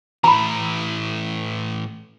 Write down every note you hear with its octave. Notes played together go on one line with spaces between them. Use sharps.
A2 E3 A#5 B5